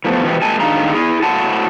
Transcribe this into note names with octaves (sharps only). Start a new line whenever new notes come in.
E3 F3 A3 B3
B2 E3 F3 B3 G4
A#2 G#3 G#5 A5
A2 D#3 D4 G#4 F5 A#5
E4 G#4
A2 F#3 F#5 A5